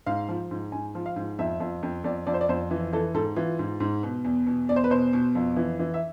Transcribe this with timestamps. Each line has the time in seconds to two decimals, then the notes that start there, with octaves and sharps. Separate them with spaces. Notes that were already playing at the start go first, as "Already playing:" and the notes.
0.06 G#2 F5
0.29 F3
0.51 G#2
0.72 G#2 G#5
0.95 F3
1.06 F5
1.16 G#2
1.39 F2 E5
1.60 F2
1.83 F2
2.04 F2 D5
2.27 F2 D5
2.34 C5
2.41 D5
2.49 F2 C5
2.71 E3
2.93 E3 A4
3.14 G#2 A4
3.36 E3 F4
3.59 G#2
3.80 G#2
4.03 B2
4.24 E2
4.47 B2
4.69 E2 D5
4.76 C5
4.84 B4
4.90 B2 C5
5.13 B2
5.35 F2
5.57 E3
5.80 E3
5.94 E5